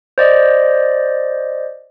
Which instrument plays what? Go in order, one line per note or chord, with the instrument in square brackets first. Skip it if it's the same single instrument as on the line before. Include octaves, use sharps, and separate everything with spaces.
[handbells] C5 D5 D#5